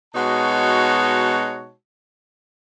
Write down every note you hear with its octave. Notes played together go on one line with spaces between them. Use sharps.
B2 G#3 D#4 F#4 C#5 A5